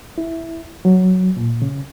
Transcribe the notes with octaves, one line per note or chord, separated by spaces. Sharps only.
E4
F#3
A#2
C#3